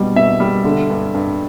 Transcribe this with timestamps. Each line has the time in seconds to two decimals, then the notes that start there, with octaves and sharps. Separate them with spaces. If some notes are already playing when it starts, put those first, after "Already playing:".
Already playing: G2 B2 G3
0.16 B2 E5
0.40 G3
0.64 D3
0.90 G2
1.14 G2